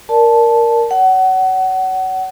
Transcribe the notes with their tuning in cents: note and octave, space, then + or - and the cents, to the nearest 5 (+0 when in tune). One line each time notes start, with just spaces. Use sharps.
A#4 +0 D5 +0 A5 -10
C#5 +30 F#5 +25